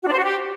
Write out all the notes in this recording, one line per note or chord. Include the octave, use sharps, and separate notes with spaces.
F#4
D4
C5
F#4
G4